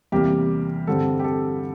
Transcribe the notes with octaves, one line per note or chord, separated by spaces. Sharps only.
E2 C3 G3 A#3 G4
G2 D3 G3 C4 A4
G4
A4